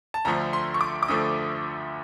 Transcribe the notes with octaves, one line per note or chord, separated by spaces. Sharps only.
A5
D2 D3 F3 A3 A#5
C6
C#6
D6
D6
D2 D3 F3 A3 D#6